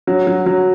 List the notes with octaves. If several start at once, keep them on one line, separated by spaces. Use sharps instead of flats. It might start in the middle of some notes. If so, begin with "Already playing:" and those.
F#3
F#3
F#3